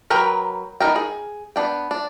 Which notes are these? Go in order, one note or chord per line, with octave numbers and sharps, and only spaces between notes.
F#3 A#4 B4 G5
B3 D#4 G#4 A#4 G5
G#4
B3 D4 G5
D4